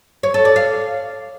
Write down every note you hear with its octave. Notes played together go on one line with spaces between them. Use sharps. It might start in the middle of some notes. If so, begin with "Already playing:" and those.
C#5
A4
D5
F5